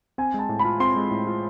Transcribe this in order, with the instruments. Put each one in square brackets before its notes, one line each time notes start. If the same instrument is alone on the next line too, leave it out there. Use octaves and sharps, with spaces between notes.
[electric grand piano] C4 [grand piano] G#5
[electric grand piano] G#3 [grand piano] A5
[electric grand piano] A2
[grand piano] B5
[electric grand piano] F4
[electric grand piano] C4 [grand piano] C6
[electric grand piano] G#3
A2
F4